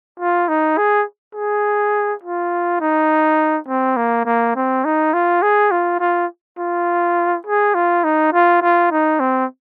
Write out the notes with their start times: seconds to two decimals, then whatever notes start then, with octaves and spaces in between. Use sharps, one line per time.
0.20 F4
0.49 D#4
0.78 G#4
1.35 G#4
2.23 F4
2.81 D#4
3.68 C4
3.97 A#3
4.26 A#3
4.55 C4
4.85 D#4
5.14 F4
5.43 G#4
5.71 F4
6.00 F4
6.59 F4
7.47 G#4
7.75 F4
8.04 D#4
8.33 F4
8.62 F4
8.91 D#4
9.20 C4